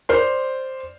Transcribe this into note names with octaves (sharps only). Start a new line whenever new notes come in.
C5 D5 F6 G6 C7